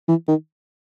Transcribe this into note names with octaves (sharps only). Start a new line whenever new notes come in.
E3
D#3